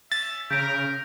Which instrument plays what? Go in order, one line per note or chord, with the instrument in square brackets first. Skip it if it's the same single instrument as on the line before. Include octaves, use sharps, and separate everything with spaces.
[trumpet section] C#4 E5 [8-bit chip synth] A6
[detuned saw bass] C#3 [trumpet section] A#4 [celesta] G6 B6 D7